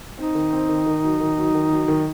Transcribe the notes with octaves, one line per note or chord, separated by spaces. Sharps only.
C4 D#4
D#3
C4
D#3
D#3
F#3
D#3
F#3
D#3
F#3
D#3